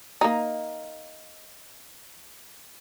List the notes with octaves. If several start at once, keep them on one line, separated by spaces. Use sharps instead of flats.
A#3 D#4